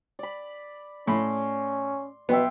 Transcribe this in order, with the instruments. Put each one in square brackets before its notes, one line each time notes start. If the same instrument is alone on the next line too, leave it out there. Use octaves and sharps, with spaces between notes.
[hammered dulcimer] D5 B5
[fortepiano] A2 B5 [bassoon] C#4 [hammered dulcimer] C6
[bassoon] B2 [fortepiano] B3 [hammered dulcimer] E5 G5 C6